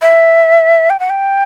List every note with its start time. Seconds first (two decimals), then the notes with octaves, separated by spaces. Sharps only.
0.02 E5
0.90 G5
1.00 F#5
1.10 G5